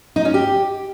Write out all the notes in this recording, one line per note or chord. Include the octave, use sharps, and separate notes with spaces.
D#4
C#4
G4